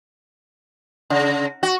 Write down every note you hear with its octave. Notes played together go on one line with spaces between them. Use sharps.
C#3
F#4